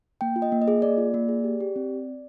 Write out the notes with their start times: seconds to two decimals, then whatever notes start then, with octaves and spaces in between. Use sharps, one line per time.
0.21 A#3 G5
0.36 F4
0.42 D#5
0.52 A#3
0.62 D#5
0.68 G#4
0.82 A#3 D5
0.98 F4
1.14 A#3
1.29 G#4
1.44 G4
1.60 G4
1.76 C4